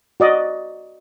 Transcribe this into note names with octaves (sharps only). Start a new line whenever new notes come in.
F#4 D5 D#5